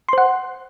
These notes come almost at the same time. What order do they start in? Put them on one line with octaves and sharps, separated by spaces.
C6 C5 F#5